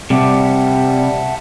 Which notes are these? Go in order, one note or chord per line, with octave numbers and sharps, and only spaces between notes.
C3 G3 E5 F#5 A5